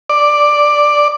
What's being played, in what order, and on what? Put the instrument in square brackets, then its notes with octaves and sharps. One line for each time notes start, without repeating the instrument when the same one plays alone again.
[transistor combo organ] D5